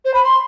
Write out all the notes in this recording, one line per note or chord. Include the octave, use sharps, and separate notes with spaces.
C5
B5
C6